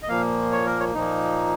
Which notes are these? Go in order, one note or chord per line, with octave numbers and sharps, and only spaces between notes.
D#5
A#2 F3 A#3 F5
C#5
A#4
C#5
A#2 F3 A#3 D#4